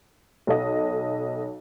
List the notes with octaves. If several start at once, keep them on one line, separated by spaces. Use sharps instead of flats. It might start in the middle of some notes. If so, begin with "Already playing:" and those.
B1 A4 D#5